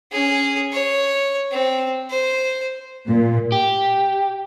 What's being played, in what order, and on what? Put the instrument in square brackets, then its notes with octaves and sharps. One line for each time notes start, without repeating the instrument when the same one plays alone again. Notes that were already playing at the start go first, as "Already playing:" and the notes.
[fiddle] C#4 G#4
C#5
C4
C5
[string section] A#2
[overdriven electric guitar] G4